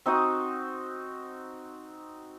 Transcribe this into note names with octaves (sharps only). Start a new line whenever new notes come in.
C4 D#4 F#4 D#6